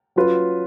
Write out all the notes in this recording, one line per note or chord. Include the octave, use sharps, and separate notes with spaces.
F#3 C#4 F4 B4